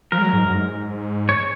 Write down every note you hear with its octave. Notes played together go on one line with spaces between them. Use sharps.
F3 A#4
G#3
F#3
G#2
F#2
G#2
C#5